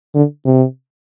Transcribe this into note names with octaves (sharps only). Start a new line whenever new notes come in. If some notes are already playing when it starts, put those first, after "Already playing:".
D3
C3